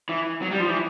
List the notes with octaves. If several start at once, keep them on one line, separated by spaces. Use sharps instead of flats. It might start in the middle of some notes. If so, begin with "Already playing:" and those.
E3
F#3
G3
F3
E3